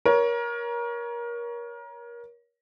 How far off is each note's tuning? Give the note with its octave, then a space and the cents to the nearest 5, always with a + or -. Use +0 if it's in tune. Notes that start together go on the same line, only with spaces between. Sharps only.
A#4 +25 C#5 +15